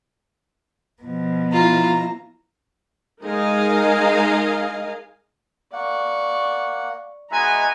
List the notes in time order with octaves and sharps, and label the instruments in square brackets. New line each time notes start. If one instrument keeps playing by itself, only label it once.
[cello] B2 F3
[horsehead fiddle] E4 A#5 [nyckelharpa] F4
[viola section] G#3 D#4 A#4 D#5 F5 G#5
[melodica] A#3 F#5 [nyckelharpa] D5 C#6
[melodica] G#3 D#4 E5 [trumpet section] B3 F#4 G#5 [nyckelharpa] A#5